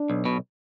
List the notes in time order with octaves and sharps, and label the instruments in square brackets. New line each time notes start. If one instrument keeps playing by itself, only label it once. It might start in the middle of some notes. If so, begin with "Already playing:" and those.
Already playing: [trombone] D4
[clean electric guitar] B1
B2